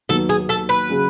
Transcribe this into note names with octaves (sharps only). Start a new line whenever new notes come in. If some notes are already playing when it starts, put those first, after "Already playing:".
D#2 D#3 F#3 B3 A4
G#4
A4
B4
C#3 F#3 C#4 G#4